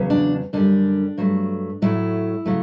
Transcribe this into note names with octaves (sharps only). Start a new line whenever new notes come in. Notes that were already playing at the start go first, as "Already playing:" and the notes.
Already playing: E2 C#3 F#3
D4
F#2 D3 G3 D4
G2 F#3 A3
A2 F#3 A3 E4
C#3 F#3 A3